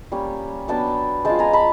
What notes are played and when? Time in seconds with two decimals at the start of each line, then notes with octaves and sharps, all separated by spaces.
0.12 G3 A#3 C#4
0.68 F#3 B3 D4 G5 A5
1.25 G#3 C#4 F4 G5 A5
1.39 G#5 A#5
1.53 A5 B5